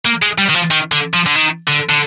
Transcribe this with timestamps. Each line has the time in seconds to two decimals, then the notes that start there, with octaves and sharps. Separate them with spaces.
0.06 A#3
0.22 G#3
0.38 G3
0.49 D#3
0.54 F3
0.71 D#3
0.92 D3
1.13 F3
1.26 D3
1.35 D#3
1.68 D3
1.89 D3